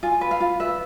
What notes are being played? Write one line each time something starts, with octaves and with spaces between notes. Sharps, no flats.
F4 G#5
B4
F5
F4
B4 E5